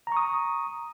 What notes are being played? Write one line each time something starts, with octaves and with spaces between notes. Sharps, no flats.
A#5 C#6 D#6